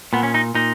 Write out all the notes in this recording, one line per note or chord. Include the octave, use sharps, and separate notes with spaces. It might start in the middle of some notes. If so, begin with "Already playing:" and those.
A#2 B3
C#4
D#4
A#2 D#4